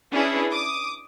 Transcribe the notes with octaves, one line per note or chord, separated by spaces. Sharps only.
C#4 D4 E4 G#4 B4
D6 D#6